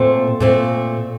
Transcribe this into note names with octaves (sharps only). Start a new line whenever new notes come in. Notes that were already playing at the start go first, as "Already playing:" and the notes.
Already playing: A#2 A3 C4 C5
A#2 A3 C4